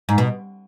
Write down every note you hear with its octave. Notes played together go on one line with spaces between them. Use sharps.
G#2
B2